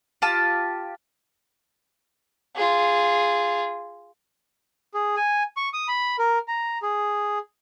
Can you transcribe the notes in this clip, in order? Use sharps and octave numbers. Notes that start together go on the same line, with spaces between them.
F4 G4 A5
F4 G#4
G#4
G#5
C#6
D#6
B5
A#4
A#5
G#4